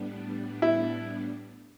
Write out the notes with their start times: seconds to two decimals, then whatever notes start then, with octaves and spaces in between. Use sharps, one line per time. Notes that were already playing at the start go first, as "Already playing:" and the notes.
Already playing: A2 G3 B3 D4
0.62 E4